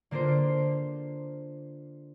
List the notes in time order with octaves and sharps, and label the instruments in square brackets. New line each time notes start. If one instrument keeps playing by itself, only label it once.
[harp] D3 A#3 D4 F4 C5